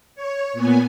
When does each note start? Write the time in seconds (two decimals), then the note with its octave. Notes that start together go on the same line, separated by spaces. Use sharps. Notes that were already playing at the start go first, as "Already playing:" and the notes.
0.15 C#5
0.53 A#2 B3 G#5